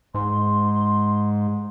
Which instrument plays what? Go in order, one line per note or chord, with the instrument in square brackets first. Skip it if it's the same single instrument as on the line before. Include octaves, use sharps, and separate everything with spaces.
[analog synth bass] G#2 [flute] C6